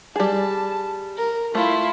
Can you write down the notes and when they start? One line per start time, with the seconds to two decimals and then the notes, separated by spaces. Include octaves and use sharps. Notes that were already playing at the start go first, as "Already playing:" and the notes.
0.16 G3 G#4 A5
1.17 A#4
1.55 A3 E4 F4